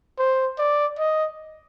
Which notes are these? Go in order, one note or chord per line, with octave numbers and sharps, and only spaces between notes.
C5
D5
D#5